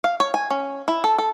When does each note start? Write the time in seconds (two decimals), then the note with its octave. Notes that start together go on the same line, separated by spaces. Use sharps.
0.04 F5
0.20 C#5
0.34 G#5
0.50 C#4
0.88 E4
1.04 A4
1.18 A4